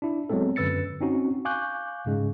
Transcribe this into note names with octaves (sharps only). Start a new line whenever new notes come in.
D4 E4
F#3 G#3 B3 C4 A4
F#2 D3 B4 E6 A6 C#7
C4 C#4 D#4 F#4
F5 G#5 C#6 D6 F#6 G6
G#2 C#3 G#3